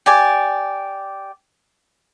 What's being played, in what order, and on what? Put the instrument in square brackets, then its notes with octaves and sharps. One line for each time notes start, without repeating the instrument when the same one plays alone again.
[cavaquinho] G4 D5 G#5